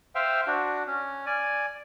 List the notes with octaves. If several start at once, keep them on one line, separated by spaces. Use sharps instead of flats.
C5 E5 F5 G5
D4 F#4
C#4
D5 G#5